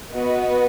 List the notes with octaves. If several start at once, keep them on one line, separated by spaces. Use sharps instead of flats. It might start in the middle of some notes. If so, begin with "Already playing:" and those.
B3 F#4 B4 D#5